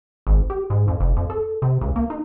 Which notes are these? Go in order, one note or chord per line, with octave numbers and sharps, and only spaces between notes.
G#1
G4
G#2
F2
F1
F2
A4
C3
C#2
A#3
D#4